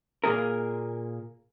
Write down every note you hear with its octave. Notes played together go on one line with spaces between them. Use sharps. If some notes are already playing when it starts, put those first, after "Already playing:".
A#2 A#3 G#4 A#4